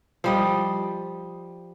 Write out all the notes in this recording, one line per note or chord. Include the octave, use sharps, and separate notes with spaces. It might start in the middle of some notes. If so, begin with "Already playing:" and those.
F3 G3 D#5